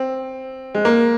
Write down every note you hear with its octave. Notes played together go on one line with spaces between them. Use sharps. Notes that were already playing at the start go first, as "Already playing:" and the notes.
Already playing: C4
G#3
A#3